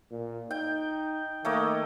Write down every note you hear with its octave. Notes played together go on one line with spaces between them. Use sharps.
A#2
D#4 G5
D#3 A3 A#3 D#5